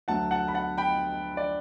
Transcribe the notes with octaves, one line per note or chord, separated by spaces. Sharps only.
D2 D3 F#3 A3 F#5 A5
F#5 A5
B5
F#5 A5
G5 B5
D5